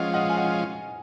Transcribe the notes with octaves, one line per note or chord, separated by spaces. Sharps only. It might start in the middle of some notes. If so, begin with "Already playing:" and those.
Already playing: F3 G#3 C#4 F4 D#5 F#5
D#5 F#5
G#5
D#5 F#5